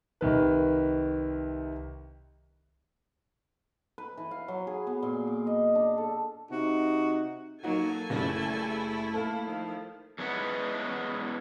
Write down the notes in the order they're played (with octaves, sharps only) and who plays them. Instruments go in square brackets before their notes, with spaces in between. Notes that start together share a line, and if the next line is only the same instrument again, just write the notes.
[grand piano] C2 D#3 B4
[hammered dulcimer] B4
E3
F5
F#3
G#4
B3
A#2
D6
D#5
D4
A4
[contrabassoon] C3 [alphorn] D#4 [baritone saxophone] F#4
[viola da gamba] F#3 [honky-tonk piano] A#3 D#4 F#4 [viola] A4 G#5
[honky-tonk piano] F#1 C#3 G3 [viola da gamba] A3 E4
[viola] A#3 [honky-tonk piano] A4 F5
[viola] D#3 F3
[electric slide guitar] E2 G#3 C#4 E4 B4 F#5